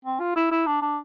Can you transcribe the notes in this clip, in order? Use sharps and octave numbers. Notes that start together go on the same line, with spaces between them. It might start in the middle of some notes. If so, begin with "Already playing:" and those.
C4
F4
E4
E4
D4
D4